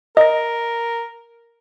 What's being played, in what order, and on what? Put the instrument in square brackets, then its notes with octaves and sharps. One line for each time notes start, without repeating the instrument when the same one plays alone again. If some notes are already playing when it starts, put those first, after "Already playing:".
[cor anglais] A#4 [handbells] D#5 A#6